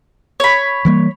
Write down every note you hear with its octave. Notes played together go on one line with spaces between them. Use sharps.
C#5 B5
E3 G3 A#3